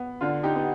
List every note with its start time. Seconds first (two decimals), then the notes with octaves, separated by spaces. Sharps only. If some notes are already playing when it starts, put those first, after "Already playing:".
Already playing: B3
0.21 D3 D4 F4
0.43 D#4 G4
0.55 B3